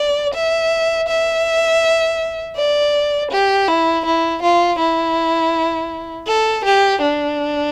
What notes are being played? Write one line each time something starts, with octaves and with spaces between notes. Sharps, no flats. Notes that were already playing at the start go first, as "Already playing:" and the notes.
Already playing: D5
E5
E5
D5
G4
E4
E4
F4
E4
A4
G4
D4